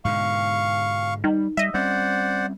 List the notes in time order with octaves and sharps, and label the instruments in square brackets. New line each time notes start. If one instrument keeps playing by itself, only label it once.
[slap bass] G#2 B2 D3 [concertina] F5 C#6
[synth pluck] D#3 [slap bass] G3
[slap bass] G3 [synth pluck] D#5 E5
[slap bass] G3 C4 C#4 [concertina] C5 D5 F#5